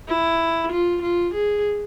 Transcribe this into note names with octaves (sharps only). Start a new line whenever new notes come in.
E4
F4
F4
G#4